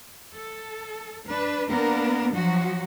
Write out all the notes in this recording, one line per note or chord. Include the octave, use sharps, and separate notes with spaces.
A4
D4 B4
A#3 B3 D4 A#4
F3 F#3 F#4